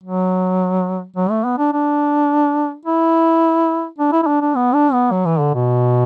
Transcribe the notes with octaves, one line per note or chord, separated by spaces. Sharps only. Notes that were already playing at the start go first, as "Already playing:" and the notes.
F#3
F#3
A3
B3
D4
D4
E4
D4
E4
E4
D4
D4
B3
D4
B3
F#3
E3
D3
B2